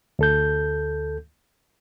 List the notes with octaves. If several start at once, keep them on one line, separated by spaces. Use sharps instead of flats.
D2 A4 G6